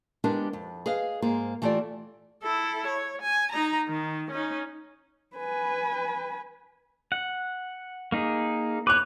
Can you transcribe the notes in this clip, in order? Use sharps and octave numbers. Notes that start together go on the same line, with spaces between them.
G#3 B3 D4 E4 G4 A#4
F2
G#4 B4 D#5 F5
G#2 A#3 G#4 C5
E3 A3 F4 G4 D5
E4 A4
C#5
G#5
D#4 A#5
D#3
C#4 D#4
B4 G#5
F#5
A#3 D#4 G#4
B4 C#5 D6 F#6